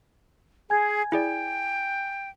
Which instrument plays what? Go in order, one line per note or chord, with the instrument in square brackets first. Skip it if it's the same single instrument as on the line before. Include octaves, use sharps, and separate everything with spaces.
[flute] G#4 [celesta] G#5 G#6
[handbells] E4 G#4 D5 [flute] G5